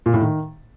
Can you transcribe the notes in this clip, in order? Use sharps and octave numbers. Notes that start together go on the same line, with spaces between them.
A#2
A2
D#3